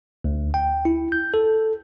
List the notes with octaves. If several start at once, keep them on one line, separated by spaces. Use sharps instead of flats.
D2
G5
E4
G6
A4